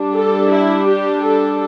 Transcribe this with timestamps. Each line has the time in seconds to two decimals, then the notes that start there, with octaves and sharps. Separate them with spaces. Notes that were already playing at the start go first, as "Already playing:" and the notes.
Already playing: G3 D4
0.13 A4
0.50 E4
0.86 G4
1.23 A4